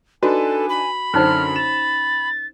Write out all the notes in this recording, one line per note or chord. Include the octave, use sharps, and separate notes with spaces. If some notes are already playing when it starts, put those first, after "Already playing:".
D4 D#4 F#4 A4 B4 G#5
B5
F#2 D3 C#4 D#4 C5 F6
A6 E7